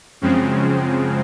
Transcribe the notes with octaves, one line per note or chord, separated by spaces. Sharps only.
F#2 C#3 F3 G#3 C4